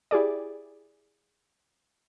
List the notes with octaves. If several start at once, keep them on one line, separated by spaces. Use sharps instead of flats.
E4 G4 G#4 D5